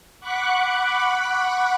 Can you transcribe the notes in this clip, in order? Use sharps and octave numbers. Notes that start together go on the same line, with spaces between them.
F#5 B5 C#6 D6 F#6